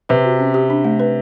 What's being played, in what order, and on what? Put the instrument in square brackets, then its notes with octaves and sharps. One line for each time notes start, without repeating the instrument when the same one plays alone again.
[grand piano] C3 [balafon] B4
[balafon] F#4
C#4
G4
D4
A3
B4